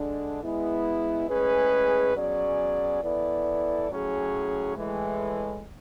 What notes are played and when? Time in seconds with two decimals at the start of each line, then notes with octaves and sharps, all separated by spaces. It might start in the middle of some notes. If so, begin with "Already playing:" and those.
Already playing: D3 G#3 D4
0.43 G#3 B3 E4
1.29 A2 G#3 C#4 G#4 B4
2.16 B2 F#3 C#4 G#4 D5
3.02 E3 B3 E4 A4 D5
3.89 A2 F#3 C#4 G#4
4.76 A2 E3 G#3